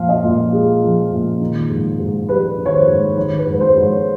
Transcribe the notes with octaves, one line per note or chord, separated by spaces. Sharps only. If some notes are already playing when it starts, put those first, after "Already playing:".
Already playing: A#2 F3 F5
D#5
A#2
G#3
F3
A#2
D#3
G#2
G#2
G3 B4
D#3
C#5
C5
G#2
D#3 C#5
B4
G#2
B4
C5
G#2
C#5